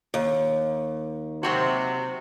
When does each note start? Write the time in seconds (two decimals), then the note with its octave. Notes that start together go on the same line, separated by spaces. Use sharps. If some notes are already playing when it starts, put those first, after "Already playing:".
0.14 D#2
1.43 C3 F#3 C4 F#4